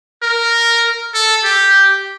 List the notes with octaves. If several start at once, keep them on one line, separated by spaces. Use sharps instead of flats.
A#4
A4
G4